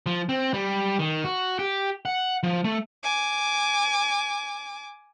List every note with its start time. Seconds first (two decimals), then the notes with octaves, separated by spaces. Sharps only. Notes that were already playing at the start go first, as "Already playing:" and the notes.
0.06 F3
0.29 C4
0.54 G3
0.99 D#3
1.24 F#4
1.59 G4
2.05 F#5
2.43 F3
2.64 A3
3.03 G#5 D6